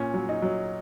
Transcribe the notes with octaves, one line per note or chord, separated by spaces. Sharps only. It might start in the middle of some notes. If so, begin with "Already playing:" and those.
Already playing: A#2 C#4
F#3
D#4
F#3